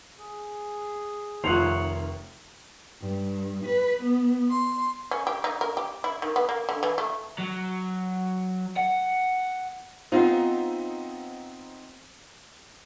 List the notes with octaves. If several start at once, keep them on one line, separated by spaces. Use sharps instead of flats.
G#4
F1 D#3 F4 C5 C#5 F#5 F7
G2
B4
B3
C6
C#4
G4
D#4
A#4
G4
E4
D#3
B3
A#3
D3
E3
A3
F#3
F#5
B3 C4 D#4 F4 C5 F#5